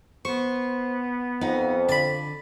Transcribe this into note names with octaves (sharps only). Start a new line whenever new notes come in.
B3 C5 C#6
F2 D#4 F#5
D3 D5 B5